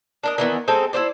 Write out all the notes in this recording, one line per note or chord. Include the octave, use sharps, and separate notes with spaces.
D4 A#4 D#5
D#3 E3 B3
G#3 C4 D#4 A4
E4 G4 C5 D5